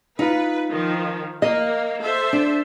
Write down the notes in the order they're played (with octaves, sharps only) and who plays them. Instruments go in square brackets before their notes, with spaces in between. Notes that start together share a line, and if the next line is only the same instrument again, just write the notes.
[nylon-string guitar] D#4 F4 [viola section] B4
[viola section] D#3 F3
[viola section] A#3 [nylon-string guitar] D#5
[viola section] A4 C5 E5
[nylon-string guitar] D4